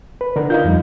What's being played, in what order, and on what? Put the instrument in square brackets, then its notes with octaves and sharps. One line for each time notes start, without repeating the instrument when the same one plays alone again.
[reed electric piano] B4
D3 D4 A#4
[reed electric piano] D#4 F5 G6 [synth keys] F4
[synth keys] F2 F3 G3